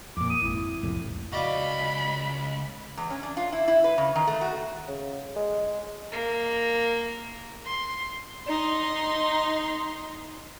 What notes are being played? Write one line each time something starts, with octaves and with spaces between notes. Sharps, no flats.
F2 A#2 D6
D#6
G#1 E4
C2 F2 A2
C#2 F#4 D5 D#5 F5 B5
E2
C#4
D4
F4
E4
E4
B4
C#3
D#3
A3
F#4
C#3
G#3
A#3
C6
D#4 C6